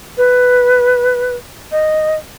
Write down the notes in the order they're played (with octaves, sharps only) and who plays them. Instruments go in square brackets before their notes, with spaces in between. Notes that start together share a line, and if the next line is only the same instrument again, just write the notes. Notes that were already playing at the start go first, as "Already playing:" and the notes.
[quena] B4
D#5